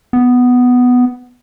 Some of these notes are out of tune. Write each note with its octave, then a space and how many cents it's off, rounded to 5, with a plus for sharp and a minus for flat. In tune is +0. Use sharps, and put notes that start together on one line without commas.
B3 +5